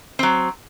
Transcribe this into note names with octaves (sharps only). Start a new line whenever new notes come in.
F#3 C4